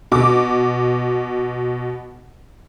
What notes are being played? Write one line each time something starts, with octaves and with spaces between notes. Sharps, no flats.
B2 D6